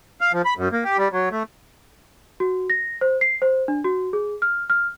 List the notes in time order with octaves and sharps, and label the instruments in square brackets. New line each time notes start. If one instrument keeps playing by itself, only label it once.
[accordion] F5
F3
B5
F#2
A#3
G4
G3
F#3
A3
[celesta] F#4
A#6
C5
C7
C5
D4
F#4
G#4
F6
F6